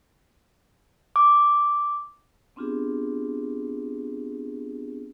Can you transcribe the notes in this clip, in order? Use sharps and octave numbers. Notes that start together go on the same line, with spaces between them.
D6
B3 C4 D4 F4 G4 G#4